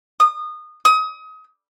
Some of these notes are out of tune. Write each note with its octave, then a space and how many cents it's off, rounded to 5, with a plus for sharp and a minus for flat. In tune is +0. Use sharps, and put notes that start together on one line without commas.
D#6 -25
D#6 +30